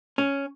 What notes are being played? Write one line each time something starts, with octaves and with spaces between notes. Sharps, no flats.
C#4